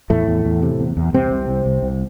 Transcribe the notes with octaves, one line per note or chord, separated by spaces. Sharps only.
E2 A2 A3
E2
E2
C3
E2
E2
C2 C3 C4
C2
C2
C2
C2